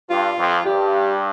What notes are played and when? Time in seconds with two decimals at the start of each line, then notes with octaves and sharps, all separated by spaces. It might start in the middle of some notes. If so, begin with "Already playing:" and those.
0.10 G2 F4
0.38 F2
0.66 G2 G4